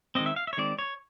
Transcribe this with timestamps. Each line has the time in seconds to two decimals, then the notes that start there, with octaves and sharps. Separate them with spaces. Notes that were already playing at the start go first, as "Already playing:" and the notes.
0.15 D#3 G#3 C4 D#5
0.26 E5
0.36 F5
0.47 E5
0.53 C#5
0.57 D#3 G#3 C4 D5
0.79 C#5